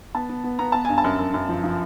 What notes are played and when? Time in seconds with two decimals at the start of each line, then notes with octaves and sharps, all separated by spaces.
0.15 B3 A5
0.29 B3
0.44 B3
0.59 B3 A#5
0.72 B3 A5
0.85 G2 G#5
0.98 A5
1.04 F#2
1.19 F#2
1.34 F#2
1.49 F3
1.64 F3